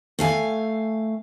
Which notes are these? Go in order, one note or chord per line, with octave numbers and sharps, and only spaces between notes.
A3 F5 G#5